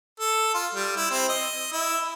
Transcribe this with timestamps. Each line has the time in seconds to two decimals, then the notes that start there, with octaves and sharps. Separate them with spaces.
0.20 A4
0.54 F4
0.75 G3
0.96 E4
1.11 C4
1.29 D#5
1.72 E4